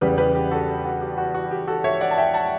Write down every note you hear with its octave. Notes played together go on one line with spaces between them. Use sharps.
E2 C#3 E3 G3 G4 B4
G4 B4
G4
F#4 A4
F#4
G4
F#4
F#4
G4
F#4 A4
C#5 E5
D5 F#5
A5
E5 G5
F#5 A5